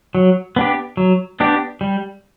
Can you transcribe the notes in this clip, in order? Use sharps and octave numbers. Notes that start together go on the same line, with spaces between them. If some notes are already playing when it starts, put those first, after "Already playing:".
F#3
B3 D4 G4
F#3
B3 D4 G4
G3